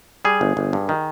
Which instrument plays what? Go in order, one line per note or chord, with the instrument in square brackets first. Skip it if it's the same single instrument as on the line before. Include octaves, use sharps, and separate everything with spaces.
[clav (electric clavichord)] G3 G#4
G1
G1
G2
D#3